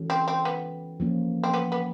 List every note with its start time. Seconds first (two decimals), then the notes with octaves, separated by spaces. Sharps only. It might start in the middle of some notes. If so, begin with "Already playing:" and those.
Already playing: E3 G#3 C#4 F#4 A4
0.10 C4
0.28 C4
0.45 B3
1.00 F3 A#3 C#4
1.43 C4
1.54 B3
1.72 B3